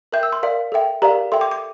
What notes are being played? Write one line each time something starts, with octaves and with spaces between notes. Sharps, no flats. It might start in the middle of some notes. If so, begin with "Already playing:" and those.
A#4 E5 G5 G6
E6
C6
A#4 D5 F5
A4 E5 G5
G4 A#4 D5 F5 A#5
A4 E5 G5 C6
D6
D6